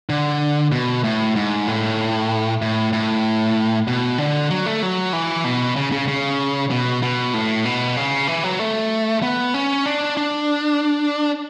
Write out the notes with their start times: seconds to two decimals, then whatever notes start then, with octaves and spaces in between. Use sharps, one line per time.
0.10 D3
0.72 B2
1.04 A2
1.36 G#2
1.67 A2
2.62 A2
2.93 A2
3.88 B2
4.18 D3
4.50 F#3
4.66 A3
4.82 F#3
5.13 E3
5.44 B2
5.76 C#3
5.92 C#3
6.08 C#3
6.71 B2
7.03 B2
7.34 A2
7.65 B2
7.97 C#3
8.28 E3
8.44 F#3
8.59 A3
9.23 B3
9.54 C#4
9.86 D4
10.17 D4